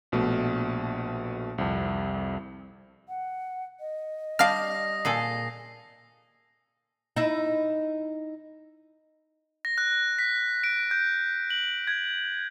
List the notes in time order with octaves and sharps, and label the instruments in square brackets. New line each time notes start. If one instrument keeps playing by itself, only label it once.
[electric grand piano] A#1 B2 A3
C2 F2
[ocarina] F#5
D#5
[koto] G3 D4 [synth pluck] F5 F6 [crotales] D#6 A#6
[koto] A#2 G#4 A4 [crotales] C7
[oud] D#4 E4
[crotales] A#6
F#6
B6
D7
G6
F#7
G#6